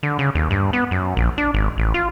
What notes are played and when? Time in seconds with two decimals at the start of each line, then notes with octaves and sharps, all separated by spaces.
0.03 D3
0.19 C#3
0.35 D#2
0.51 G2
0.73 B3
0.91 F#2
1.17 A#1
1.38 D4
1.54 G#1
1.78 A1
1.94 F4